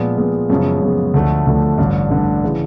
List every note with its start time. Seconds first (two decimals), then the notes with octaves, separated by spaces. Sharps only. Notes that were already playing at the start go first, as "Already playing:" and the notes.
Already playing: A#2 F3 G#3 B3
0.18 A#2 F3 G#3 B3
0.50 F#2 C#3 F3 G#3 B3
0.82 F#2 C#3 F3 G#3 B3
1.14 D2 D3 F3 A3
1.47 D2 D3 F3 A3
1.78 A1 G2 D3
2.10 A1 G2 D3
2.44 C#3 E3